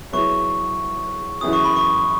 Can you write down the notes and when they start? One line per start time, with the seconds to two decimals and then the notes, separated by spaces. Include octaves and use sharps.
0.12 F#3 B3 E4 G#4 C#6
1.41 F#2 E3 B3 E4 G#4 D#6
1.53 C#6
1.64 B5
1.76 C#6